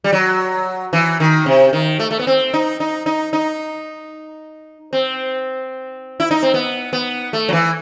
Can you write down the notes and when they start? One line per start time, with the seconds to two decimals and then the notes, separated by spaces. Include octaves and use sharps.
0.04 G3
0.13 F#3
0.93 E3
1.20 D#3
1.46 C3
1.73 D#3
1.99 A3
2.11 A3
2.19 B3
2.27 C4
2.54 D#4
2.80 D#4
3.06 D#4
3.33 D#4
4.93 C4
6.20 E4
6.31 D#4
6.43 C4
6.54 B3
6.93 B3
7.33 A3
7.49 F#3
7.53 E3